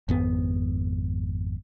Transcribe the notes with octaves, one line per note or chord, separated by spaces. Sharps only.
G#1 F2 B3